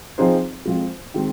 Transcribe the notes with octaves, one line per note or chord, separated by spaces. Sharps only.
F3 C4 D#4 G#4 C5
F2 F3 G#3
D#3 G#3 C4